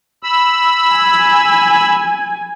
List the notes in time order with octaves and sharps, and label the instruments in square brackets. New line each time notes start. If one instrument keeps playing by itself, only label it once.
[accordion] B5 E6
[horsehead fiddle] G#5